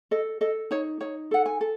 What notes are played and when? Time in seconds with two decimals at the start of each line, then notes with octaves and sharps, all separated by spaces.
0.11 A4 D#5
0.41 A4 D#5
0.71 D#4 C#5
1.01 D#4 C#5
1.31 A4 F#5
1.46 G#5
1.61 A4